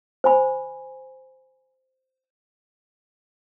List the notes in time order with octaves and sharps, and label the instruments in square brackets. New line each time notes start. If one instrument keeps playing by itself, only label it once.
[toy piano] C5 G#5 B5